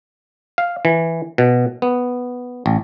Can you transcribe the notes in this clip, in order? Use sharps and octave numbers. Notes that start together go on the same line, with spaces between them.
F5
E3
B2
B3
A1